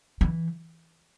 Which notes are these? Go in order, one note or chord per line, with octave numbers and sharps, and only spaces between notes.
E3